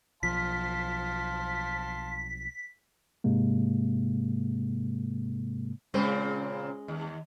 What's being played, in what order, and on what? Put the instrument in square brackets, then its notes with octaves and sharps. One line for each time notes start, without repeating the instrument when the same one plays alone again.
[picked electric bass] B1 F3 [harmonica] F5 A5 C6 [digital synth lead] B6
[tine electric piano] G#2 C3 G#3 A#3
[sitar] A#2 C#3 C4 [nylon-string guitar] G#3 C#4 C5
[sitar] D#2